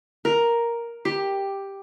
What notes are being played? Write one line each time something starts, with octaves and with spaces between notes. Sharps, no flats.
A#4
G4